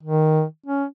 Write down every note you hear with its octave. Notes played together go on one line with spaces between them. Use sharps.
D#3
C#4